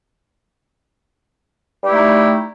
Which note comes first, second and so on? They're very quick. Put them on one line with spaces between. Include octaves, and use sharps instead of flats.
G3 G4 E4 A3 D#4